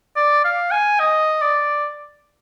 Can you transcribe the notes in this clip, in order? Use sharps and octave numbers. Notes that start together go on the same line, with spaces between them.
D5
F5
G#5
D#5
D5